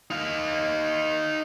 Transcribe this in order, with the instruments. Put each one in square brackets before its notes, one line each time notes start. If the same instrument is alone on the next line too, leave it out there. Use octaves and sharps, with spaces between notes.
[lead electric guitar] D#4 F5